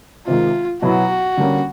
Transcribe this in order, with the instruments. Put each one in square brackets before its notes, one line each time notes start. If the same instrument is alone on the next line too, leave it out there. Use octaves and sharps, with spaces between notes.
[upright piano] C3 D#3 G#3 [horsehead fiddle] F4
[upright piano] B2 F#3 B3 E4 [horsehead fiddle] F#4
[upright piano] D3 G3 A#3 C#4